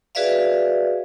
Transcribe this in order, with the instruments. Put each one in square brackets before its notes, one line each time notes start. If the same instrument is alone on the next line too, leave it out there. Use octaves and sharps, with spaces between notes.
[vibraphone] F#4 G#4 B4 D5 E5 F5